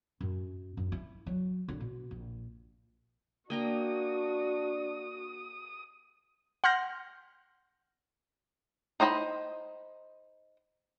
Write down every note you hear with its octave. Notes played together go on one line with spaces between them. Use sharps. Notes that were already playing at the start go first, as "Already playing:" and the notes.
F#2
F#2
E4
F#3
D3
B2
A#1
A#3 D4 F#4 G5 A#5 D#6
F#5 C6 F6 G6 A#6
D#4 C5 D#5 G#5 B5